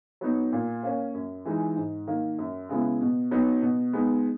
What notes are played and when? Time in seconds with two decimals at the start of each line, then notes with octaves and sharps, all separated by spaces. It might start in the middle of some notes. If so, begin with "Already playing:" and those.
0.21 F#3 B3 D#4
0.52 A#2
0.83 A#3 C#4
1.14 F#2
1.45 E3 G#3 D#4
1.76 G#2
2.07 D#3 A#3
2.39 F#2
2.69 C#3 G#3 B3 E4
3.01 B2
3.31 F#3 B3 D#4
3.62 B2
3.93 G#3 B3 D#4